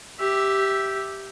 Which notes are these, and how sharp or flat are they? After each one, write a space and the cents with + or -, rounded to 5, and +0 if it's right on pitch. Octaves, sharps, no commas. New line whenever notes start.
G4 -5 E5 +0